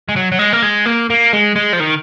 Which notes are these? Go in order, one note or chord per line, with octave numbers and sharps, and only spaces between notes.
G#3
F#3
F#3
G#3
A#3
G#3
A#3
A#3
G#3
G#3
F3
D#3